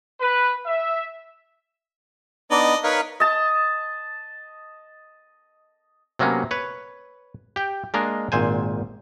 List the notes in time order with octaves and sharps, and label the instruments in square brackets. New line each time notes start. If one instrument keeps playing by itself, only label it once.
[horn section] B4
E5
[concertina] B3 D4 D#4 [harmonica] D5 D#5
[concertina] D#4 A#4 F5 [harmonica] B4 C#5
[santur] D#5 A5
[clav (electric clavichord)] C3 F#3 A#3 B3 C#4
B4 C#5
G4 G5
G#3 A#3 D4 A#4 D#5
G#1 A#2 C5 G#5